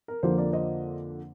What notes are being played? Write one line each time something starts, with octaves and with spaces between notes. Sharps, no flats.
A#4
F2 D3 F3 A#3 C5
A#4 D5
C5 D#5